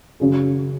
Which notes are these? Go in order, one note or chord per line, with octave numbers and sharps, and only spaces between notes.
F#2 C#3 F#3 C#4 G#4